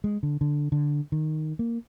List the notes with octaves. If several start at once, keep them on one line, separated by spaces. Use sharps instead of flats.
G#3
D3
D3
D3
D#3
A#3